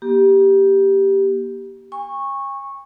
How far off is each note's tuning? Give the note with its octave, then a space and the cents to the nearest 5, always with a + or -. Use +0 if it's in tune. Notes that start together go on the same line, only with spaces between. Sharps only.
A#3 +40 G4 +0
G#5 -45 C#6 -15